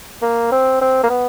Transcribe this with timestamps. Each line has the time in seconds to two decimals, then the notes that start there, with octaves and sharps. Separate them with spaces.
0.22 A#3
0.52 C4
0.81 C4
1.03 A#3
1.09 B3